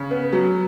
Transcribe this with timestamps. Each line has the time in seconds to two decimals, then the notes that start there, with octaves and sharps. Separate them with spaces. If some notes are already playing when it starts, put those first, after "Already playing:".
Already playing: C#3
0.11 B3
0.33 F#3